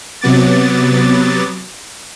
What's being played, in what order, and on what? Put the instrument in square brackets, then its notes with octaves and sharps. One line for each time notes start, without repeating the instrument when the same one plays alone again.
[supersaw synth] C3 F#3 B3 D6 A6